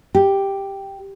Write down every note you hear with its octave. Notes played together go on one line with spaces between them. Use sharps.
G4